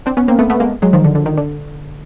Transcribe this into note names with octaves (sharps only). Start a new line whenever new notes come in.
C4 D4
B3 C#4
A#3 C4
A3 B3
A3 B3
G#3 A#3
F#3 G#3
D#3 F3
D3
D3
D#3
D3